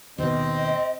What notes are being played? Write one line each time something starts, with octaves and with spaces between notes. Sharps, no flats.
D#2 B2 C4 D#5